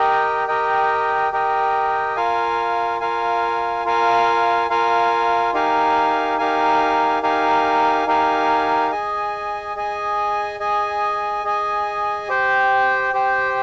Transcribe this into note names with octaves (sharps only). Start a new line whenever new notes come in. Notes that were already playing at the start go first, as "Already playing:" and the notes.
Already playing: G4 A#4 D#5 G5
G4 A#4 D#5 G5
G4 A#4 D#5 G5
F4 A#4 F5 G#5
F4 A#4 F5 G#5
F4 A#4 F5 G#5
F4 A#4 F5 G#5
D#4 G4 A#4 F5 G#5
D#4 G4 A#4 F5 G#5
D#4 G4 A#4 F5 G#5
D#4 G4 A#4 F5 G#5
G#4 D#5 G#5
G#4 D#5 G#5
G#4 D#5 G#5
G#4 D#5 G#5
G4 C5 G5
G4 C5 G5